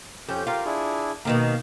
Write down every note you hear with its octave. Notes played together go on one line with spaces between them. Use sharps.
F2 C#4 G4 G6
F4 G4 A#4 F5
D4 E4 G#4
B2 D#3 A#3 F5